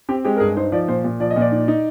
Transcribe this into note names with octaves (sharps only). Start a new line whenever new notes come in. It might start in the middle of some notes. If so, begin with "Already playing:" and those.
C4 G4
G#3 G4
A#4
G2 G#4
D#4 C5
F3 D5
A#2 C5
A#2
F3 D5
D#5
A#2 D5
D#4
D#4